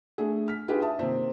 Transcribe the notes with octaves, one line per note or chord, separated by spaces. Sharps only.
A3 D4 G#4
F6 B6
D4 D#4 F4 G4 G#4 B4
E5 A5 D#6
C3 D#3 A#3 C4